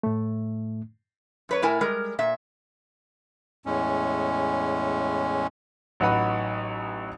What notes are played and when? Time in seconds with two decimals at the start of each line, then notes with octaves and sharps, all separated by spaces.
0.03 A2 A3
1.49 F#2 B4 C#5
1.62 A2 E4 A#4 G#5
1.81 G3 G#3 A#4
2.19 A#2 E5
3.66 E2 A2 G#3 C#4
6.00 A1 F#3 D#4 B4 F#5 B5